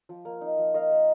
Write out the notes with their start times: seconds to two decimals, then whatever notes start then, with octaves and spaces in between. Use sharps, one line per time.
0.09 F3
0.25 A#3
0.41 D#4
0.58 F3
0.74 A#3 D#5 F5
0.91 A#3